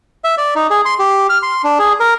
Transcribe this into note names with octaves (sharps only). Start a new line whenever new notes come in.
E5
D5
D#4
G#4
C6
G4
F6
C6
D4
G#4
A#4